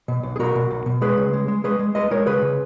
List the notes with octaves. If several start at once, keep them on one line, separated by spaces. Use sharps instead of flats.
B2
B1
G#4
B2 F#4 A#4
B2
B1
B2
G#3 G#4 B4
C#3
G#3
G#3
G#3 G#4 B4
G#3
G#3 B4 D#5
G#3 A#4 C#5
C#3 G#4 B4
C#3